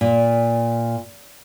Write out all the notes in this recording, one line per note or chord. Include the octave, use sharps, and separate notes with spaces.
A#2